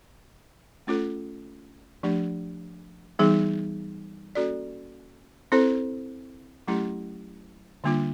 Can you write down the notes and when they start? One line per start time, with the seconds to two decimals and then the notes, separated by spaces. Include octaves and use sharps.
0.87 A3 C#4 F4 A4
2.03 F3 A3 D4 G4
3.19 E3 G3 B3 D#4 G#4
4.35 A#3 C#4 F#4 A4 D5
5.52 C4 E4 A4 C5
6.68 F#3 A3 C#4 E4 G4
7.84 D3 G3 A#3 D4 F4